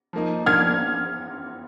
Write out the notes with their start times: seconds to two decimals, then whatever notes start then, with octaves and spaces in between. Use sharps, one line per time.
0.13 F3 A#3 D#4
0.46 F3 A#3 D4 F4 A#4 F6 G#6